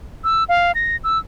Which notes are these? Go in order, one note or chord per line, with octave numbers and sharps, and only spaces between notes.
E6
F5
A#6
E6